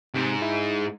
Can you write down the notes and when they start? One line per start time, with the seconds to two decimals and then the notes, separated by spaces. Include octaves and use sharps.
0.14 G#2 C3
0.42 E4